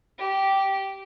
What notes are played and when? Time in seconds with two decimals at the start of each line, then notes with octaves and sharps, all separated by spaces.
0.19 G4